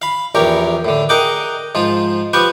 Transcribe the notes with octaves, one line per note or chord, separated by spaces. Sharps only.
F5 B5
A#1 E2 C#4 G4 A#4 C#5
A2 D3
G#4 A#4 D#5 F#5 G5 D6
G#2 F3 F4
F3 B3 G4 B4 G5 C#6